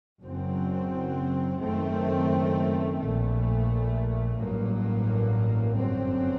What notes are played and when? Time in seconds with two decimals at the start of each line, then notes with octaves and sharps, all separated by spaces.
0.22 F#1 F#2 F#3 C4
1.61 F#1 F#2 D#3 A3 C4
3.00 A#1 A#2 A3
4.39 A1 G2 F#3 A#3
5.77 G1 F#2 F#3 C4